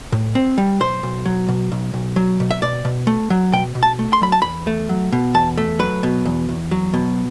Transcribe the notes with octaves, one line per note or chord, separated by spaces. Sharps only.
A2
C4
G3
B1 C5
B1
F#3
B2
B1
B1
F#3
B2
E5
B2 D5
B2
A3
F#3
B2 G5
B2
A5
A3
C6
F#3 B5
A5
E2 B5
A3
F#3
B2
E2 A5
A3
F#3 B4
B2
E2
E2
F#3
B2